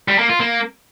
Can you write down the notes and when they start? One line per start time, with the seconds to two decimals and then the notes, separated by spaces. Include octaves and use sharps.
0.08 G3
0.19 A#3
0.29 F4
0.40 A#3